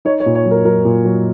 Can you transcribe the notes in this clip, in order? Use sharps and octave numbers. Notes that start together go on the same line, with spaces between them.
D#4 C#5
C#5
A#2
C#5
F#3
A#4
F#3 A#4
A#2
F#3